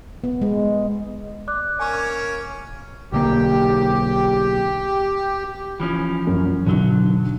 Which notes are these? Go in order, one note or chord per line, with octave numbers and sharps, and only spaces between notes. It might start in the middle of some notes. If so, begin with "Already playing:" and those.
B3
G#3
D5 D6 F#6
A#3 C#4 C#5 G#5 C#6
B1 D3 A#3 G4
E3 F3 C#4
F#2
B1 D3 F#3